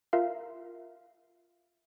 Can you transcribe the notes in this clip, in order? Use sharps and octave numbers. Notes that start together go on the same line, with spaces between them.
F4 A#4 E5 F5